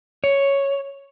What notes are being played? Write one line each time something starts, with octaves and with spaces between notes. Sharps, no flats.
C#5